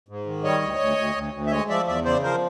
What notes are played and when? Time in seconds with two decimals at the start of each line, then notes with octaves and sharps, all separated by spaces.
0.08 G#2
0.26 D#3
0.44 G3 C#5 D#5
0.62 D2
0.80 D2
0.97 D2
1.15 D2
1.34 D2
1.47 E5
1.51 G#3 C#5 D#5
1.69 F3 D5 E5
1.87 E2 D5 E5
2.05 C#3 C5 D5
2.23 F3 A#4 C5